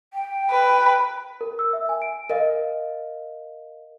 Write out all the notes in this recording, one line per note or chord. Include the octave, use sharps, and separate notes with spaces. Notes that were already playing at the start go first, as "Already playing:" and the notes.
G5
B4
A#4
E6
E5
G#5
D7
A#4 D#5 F5